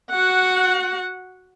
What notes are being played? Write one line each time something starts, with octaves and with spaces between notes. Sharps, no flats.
F#4 F#5